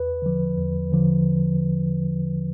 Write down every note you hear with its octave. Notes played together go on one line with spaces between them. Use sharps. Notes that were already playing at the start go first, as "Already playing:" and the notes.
Already playing: E2 B4
D3 F3
E2
D3 F3